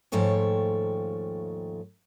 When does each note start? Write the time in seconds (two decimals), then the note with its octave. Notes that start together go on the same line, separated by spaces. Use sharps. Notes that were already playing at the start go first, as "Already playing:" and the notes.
0.12 D#2 G#2 F3 A3 C#5 G5